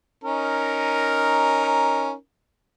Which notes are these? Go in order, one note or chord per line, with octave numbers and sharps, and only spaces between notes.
C#4 D#4 A#4